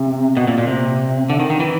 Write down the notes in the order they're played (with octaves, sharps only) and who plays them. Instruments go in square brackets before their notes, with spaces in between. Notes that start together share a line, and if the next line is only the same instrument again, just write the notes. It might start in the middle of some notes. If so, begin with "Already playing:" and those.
Already playing: [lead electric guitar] C3
B2
A#2
A#2
C3
D3
D#3
D#3
E3